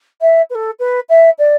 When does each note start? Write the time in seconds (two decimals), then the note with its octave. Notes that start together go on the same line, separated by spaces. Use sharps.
0.21 E5
0.50 B4
0.55 A4
0.80 B4
1.09 E5
1.39 D5